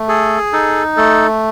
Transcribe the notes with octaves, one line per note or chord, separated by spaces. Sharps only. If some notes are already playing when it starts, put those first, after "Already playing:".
Already playing: A3
G#4 A4
D#4 A4
A3 A4